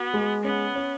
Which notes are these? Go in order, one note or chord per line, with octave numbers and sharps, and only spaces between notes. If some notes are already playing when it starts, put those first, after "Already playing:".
Already playing: B3 F#4
G#3
B3 C#4
C#4